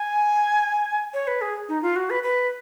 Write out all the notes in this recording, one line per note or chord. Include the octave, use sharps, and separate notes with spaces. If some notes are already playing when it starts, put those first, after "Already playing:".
Already playing: G#5
C#5
B4
G#4
D#4
F4
F#4
B4
B4